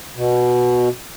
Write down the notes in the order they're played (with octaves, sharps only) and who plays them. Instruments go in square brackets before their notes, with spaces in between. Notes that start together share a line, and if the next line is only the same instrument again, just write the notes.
[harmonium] B2